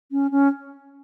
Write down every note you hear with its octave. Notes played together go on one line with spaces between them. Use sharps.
C#4
C#4